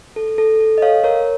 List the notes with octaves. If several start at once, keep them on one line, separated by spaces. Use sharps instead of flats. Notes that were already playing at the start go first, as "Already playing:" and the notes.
A4
A4
A4
D#5
C#5 F5
A#4 C#5